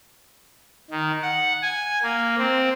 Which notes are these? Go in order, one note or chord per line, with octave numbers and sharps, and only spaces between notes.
D#3
F#5
G#5
A#3
C4